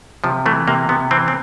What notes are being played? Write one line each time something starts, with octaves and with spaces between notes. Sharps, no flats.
C3 F3
E3 A3
C3 A#3
C3 B3
E3 C4
C4